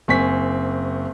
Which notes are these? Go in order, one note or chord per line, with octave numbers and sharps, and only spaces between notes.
F#1 C4 G#5 C#6 B6